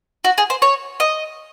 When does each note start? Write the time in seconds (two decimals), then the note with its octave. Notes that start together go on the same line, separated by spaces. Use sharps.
0.24 F#4
0.38 G#4
0.50 C5
0.62 C#5
1.00 D#5